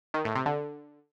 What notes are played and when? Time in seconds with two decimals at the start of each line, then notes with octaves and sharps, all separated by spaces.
0.14 D#3
0.25 A2
0.35 C3
0.46 D3